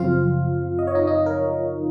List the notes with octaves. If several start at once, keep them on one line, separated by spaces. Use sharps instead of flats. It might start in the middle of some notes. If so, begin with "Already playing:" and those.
Already playing: F#2 C#3 F3 C4 F4 F5
D#5
C#5
D#4 D#5
D#4 D#5
A#4